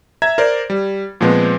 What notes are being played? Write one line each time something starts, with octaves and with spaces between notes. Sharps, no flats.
E5 A#5 G#6
A#4 C5 D5
G3
A#2 F3 G#3 B3 C4